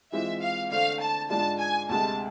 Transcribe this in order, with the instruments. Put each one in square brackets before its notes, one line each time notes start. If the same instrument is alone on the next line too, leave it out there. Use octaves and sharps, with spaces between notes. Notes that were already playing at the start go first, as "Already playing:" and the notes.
[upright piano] E3 G#3 C4 F4 [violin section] E5
[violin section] F5
[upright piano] D3 A3 D4 A4 C5 [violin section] F5
[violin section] A5
[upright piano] G#2 G#3 D4 F4 [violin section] A5
[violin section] G#5
[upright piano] D2 C3 G#3 [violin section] A5